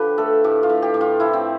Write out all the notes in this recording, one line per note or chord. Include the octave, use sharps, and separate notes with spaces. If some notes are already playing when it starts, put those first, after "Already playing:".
Already playing: D3 F3 G4 B4
A3 A4
A2 G4
F4
A2
G4
A2
F4
F3 E4
C4